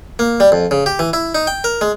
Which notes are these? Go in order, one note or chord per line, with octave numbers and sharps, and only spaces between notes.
A#3
G3
F2
C#3
G4
E3
E4
D#4
G5
A#4
G#3